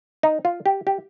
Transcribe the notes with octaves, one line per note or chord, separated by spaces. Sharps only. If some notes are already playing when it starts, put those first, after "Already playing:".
D#4
F4
G4
G4